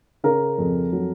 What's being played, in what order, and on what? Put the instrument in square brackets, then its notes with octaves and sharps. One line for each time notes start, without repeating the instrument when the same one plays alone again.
[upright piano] C#3 A#4
F2
F#3